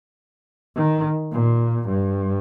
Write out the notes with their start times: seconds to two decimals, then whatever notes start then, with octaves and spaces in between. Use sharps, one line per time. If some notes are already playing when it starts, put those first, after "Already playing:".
0.76 D#3
1.32 A#2
1.89 G2